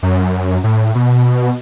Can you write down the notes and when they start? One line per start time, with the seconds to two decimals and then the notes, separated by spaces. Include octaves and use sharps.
0.03 F#2
0.64 A2
0.95 B2